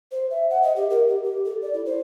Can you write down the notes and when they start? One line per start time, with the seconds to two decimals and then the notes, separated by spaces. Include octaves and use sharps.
0.12 C5
0.31 E5
0.50 F#5
0.63 D#5
0.76 G4
0.90 A#4
1.09 G4
1.23 G4
1.45 A4
1.62 D5
1.74 E4
1.86 C5